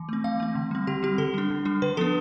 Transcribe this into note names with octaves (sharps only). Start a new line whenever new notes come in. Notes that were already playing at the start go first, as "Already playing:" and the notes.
Already playing: E3
A3 C4
E3 F5
A3 C4
D3
G3 C4
D3 G4
G3 C4 G4
D3 A4
G3 D4
D3
G3 D4
D3 B4
F3 B3 D4 A4